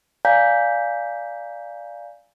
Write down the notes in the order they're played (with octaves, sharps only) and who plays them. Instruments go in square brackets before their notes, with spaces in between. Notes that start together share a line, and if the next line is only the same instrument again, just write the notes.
[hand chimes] D5 F5 G#5 A#5 G6 B6